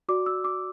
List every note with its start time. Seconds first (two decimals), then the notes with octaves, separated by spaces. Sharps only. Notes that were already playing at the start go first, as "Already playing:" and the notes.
0.09 F#4 D5 D6
0.26 E6
0.44 D6